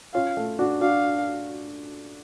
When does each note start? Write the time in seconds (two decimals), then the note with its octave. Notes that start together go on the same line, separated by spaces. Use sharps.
0.14 C#4 F4 F5
0.37 A3
0.59 D4 F#4
0.81 D4 F#4 F5